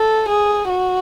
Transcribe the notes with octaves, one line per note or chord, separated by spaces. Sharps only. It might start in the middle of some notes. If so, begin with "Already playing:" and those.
Already playing: A4
G#4
F#4